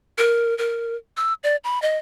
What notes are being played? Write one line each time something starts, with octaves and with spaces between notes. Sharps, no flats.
A#4
A#4
E6
D5
B5
D#5